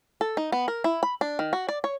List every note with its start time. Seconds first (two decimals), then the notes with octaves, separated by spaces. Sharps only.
0.21 A4
0.37 D#4
0.52 B3
0.68 A#4
0.84 E4
1.03 B5
1.21 D4
1.39 D#3
1.53 F#4
1.69 D5
1.84 C#5